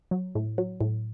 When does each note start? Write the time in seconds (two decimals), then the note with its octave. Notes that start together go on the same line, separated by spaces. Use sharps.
0.11 F#3
0.35 A2
0.58 F#3
0.81 A2